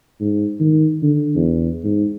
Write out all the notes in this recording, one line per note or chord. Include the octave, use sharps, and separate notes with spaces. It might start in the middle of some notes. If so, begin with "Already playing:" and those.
G#2
D#3
D3
E2
G#2